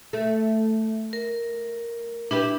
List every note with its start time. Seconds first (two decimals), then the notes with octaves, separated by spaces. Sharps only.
0.13 A3
1.13 A#4
2.31 D4 E4 G4 B4